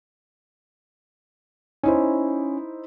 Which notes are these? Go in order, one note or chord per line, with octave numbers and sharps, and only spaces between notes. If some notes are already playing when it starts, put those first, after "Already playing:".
C#4 D#4 E4 C5